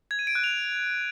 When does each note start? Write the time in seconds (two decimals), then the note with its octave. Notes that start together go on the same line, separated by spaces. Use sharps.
0.11 G#6
0.19 D#7
0.27 D7
0.35 F#6
0.44 F7